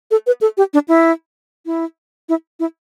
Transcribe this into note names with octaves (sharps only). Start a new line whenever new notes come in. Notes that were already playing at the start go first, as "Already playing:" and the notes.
A4
B4
A4
G4
D4
E4
E4
E4
E4